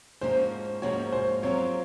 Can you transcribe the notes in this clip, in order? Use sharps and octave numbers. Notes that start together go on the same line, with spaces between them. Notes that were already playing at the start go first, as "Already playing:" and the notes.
G#2 F3 A#3 C#4 F#4 C5
G#2 F3 A#3 C#4 F#4 C#5
C5
F#3 C4 F4 A#4 C#5